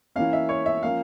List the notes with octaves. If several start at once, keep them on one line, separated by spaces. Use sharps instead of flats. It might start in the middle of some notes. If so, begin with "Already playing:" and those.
E3 A#3 C#4 F5
E5
C#5
E5
F3 A#3 C#4 F5